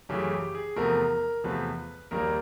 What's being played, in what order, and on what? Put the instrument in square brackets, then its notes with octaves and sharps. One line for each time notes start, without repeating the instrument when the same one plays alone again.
[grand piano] F#2 C#3 E3 A3 G4
G4
G#4
E2 C3 F3 A3 A#4
E2 C3 F3 A3 B4
D#2 D#3 G3 A#3 A#4